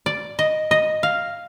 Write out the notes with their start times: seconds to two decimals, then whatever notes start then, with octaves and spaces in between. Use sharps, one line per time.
0.06 D5
0.39 D#5
0.71 D#5
1.03 F5